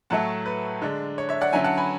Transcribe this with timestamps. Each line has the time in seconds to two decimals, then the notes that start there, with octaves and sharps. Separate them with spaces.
0.10 A2 F#3 A3 E4 F#5 A5
0.46 B4
0.82 D3 G#3 D4
1.18 C#5
1.29 C#5 E5
1.41 D5 F#5
1.53 D3 F#3 C#4 E4 E5 G#5
1.64 F#5 A5
1.77 G#5 B5